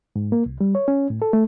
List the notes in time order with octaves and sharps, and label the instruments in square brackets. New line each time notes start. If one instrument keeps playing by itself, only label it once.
[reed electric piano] G#2
A#3
C2
G3
C#5
C#4
A2
A4
A3